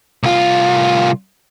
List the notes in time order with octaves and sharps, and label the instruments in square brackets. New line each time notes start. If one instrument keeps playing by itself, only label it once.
[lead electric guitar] C2 F4